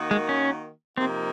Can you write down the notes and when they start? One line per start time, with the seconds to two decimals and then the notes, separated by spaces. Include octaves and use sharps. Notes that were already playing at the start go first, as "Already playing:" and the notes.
Already playing: D#3 A#3 D#4 F#4
0.11 G#3
0.29 C#4
0.97 C3 F3 A#3 C4 D#4